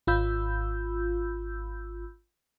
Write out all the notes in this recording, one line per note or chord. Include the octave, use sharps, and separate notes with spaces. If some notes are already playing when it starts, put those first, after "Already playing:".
G#1 F4 B5 E6 G6